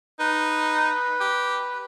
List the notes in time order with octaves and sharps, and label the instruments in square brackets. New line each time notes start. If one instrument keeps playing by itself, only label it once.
[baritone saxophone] D#4 [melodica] B4
[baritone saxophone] G4